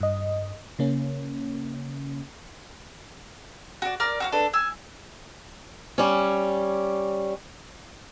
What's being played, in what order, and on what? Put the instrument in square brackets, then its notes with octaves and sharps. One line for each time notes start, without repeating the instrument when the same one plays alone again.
[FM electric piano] G2 D#5
C#3 A#3 C#4
[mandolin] F#4 D5
A#4 D5 A#5 F6
F#4 C5 F5
D4 A4 B4
G#5 E6
[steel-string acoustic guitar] G3 C#4